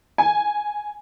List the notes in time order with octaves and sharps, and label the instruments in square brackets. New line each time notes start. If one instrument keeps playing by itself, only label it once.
[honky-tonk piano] G#5